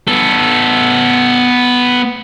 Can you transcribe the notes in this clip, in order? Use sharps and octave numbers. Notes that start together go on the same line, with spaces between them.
B3 A4